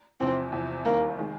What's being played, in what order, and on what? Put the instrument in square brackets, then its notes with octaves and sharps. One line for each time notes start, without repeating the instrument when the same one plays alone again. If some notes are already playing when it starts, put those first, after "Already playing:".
[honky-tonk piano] E2 C3 F3 [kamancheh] C4
[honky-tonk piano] E2 C3 F3
[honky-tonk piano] D#2 D#3 G3 [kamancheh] A#3
[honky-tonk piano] D#3 G#3